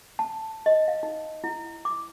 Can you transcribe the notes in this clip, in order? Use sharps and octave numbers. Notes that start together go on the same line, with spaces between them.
A5
D#5
F5
D#4
E4
D6